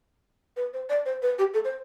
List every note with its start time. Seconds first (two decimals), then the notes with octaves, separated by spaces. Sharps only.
0.57 B4
0.73 C5
0.89 D5
1.06 C5
1.22 B4
1.39 G4
1.54 A4
1.64 C5